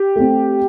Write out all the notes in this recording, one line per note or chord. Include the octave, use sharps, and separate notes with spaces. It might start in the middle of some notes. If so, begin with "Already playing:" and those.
Already playing: G4
A3 C4